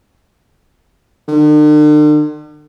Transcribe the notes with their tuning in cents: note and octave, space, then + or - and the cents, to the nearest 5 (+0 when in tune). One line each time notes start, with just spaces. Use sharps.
D3 +45